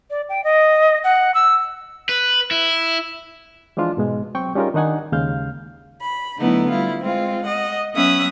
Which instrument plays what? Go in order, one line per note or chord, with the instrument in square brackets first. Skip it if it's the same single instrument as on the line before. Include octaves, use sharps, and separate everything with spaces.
[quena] D5
G5
D#5
F#5
E6
[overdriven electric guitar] B4
E4
[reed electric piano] E3 F3 G#3 D4 F4
G#2 B2 G#3
F#3 C4 G5 C#6
G3 C#4 D#4 F4 G#4 A#4
D#3 D4 D#4 F#5 G#5
D#2 C#3 G#3 F5 F6 G6
[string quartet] B5
D3 F#3 A3 B3 D#4 E4
G3 E4 F4
G#3 C4 F4
D#5 F#5
F#3 B3 C#4 E5 D#6 F#6